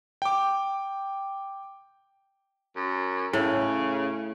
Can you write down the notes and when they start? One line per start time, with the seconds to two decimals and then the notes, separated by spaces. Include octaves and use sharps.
0.22 G5 D6
2.76 F#2
3.33 A2 C#3